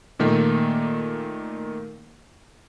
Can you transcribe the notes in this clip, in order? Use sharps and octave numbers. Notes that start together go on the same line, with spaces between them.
A#2 D#3 A3 A#3